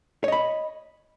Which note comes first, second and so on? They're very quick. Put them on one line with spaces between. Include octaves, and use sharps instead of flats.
C#5 D#5 B5